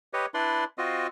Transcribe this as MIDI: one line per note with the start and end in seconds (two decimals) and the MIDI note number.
0.13 0.26 67
0.13 0.26 71
0.13 0.26 73
0.13 0.26 75
0.34 0.64 62
0.34 0.64 64
0.34 0.64 71
0.34 0.64 74
0.34 0.64 84
0.78 1.07 60
0.78 1.07 65
0.78 1.07 66
0.78 1.07 75